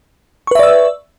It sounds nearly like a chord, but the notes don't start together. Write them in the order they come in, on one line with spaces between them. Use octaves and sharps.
C#6 B4 E5 D5 E6